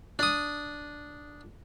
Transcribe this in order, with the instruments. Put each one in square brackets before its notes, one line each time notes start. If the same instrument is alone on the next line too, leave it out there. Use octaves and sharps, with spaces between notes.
[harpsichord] D4 D#6